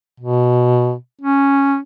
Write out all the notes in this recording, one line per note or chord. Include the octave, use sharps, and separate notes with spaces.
B2
C#4